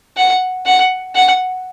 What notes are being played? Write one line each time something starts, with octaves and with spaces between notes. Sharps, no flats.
F#5
F#5
F#5